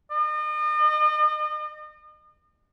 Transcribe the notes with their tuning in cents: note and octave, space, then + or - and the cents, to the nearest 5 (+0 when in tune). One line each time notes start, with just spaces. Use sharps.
D#5 -40